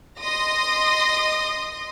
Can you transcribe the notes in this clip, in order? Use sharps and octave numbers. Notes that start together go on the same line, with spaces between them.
D#5 C6 D#6 A#6